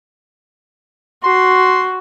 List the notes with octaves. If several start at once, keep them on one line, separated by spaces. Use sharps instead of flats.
F#4 C6